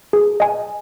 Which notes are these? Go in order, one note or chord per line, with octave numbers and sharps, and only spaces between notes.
G#4
D#5 G#5